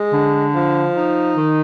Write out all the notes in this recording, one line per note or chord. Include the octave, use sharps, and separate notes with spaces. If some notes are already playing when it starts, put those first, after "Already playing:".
Already playing: G#3
D3
F3
D#4
D#3